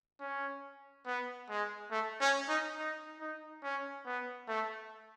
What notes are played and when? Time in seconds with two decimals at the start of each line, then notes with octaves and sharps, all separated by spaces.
0.20 C#4
1.06 B3
1.49 G#3
1.91 A3
2.21 C#4
2.49 D#4
2.77 D#4
3.20 D#4
3.63 C#4
4.06 B3
4.48 A3